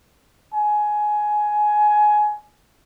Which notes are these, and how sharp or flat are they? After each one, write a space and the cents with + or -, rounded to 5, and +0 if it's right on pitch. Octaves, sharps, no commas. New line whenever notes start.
G#5 +15